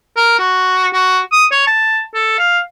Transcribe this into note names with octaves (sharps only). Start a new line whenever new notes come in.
A#4
F#4
F#4
D#6
C#5
A5
A4
F5